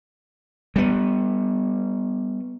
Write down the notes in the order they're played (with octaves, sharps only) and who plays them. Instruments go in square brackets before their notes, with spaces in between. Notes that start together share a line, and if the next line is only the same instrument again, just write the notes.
[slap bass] G3 B3